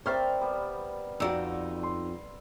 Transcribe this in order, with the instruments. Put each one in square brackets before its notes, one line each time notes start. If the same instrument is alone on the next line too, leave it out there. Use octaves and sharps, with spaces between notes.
[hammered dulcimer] G3 C4 A#4 [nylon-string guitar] C5 E5 [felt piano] C#6 F6 A6
[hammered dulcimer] G3 B3
[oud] F2 D5 [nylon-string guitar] D#4 F#5 [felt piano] F#4 E6
[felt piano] C6